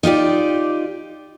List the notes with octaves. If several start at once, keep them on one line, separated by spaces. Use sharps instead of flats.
D#4 F4 G4 D5